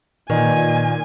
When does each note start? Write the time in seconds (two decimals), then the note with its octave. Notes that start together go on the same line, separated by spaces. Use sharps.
0.30 A#2 D#3 B4 D5 D#5 G#5